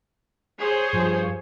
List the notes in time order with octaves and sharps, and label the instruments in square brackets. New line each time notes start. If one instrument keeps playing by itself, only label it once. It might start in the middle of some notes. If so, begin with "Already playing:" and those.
[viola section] G#4 C5 C#5
[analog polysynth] G2 F3